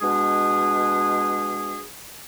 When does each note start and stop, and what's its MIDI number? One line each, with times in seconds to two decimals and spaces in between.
0.02 1.84 47
0.02 1.84 56
0.02 1.84 62
0.02 1.84 68